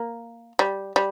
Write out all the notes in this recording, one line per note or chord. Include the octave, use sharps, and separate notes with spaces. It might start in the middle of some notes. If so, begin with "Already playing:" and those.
Already playing: A#3
G3
G3